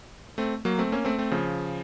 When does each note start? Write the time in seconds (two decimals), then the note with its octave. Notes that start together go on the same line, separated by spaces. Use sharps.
0.38 A3 C4
0.65 F#3 A#3
0.79 A3 C4
0.92 A#3 C#4
1.05 A3 C4
1.18 A3 C4
1.31 C#3 F3